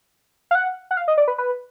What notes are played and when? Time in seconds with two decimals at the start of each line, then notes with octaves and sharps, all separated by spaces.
0.51 F5
0.55 F#5
0.91 F#5
0.97 F5
1.08 D#5
1.18 D5
1.28 B4
1.38 B4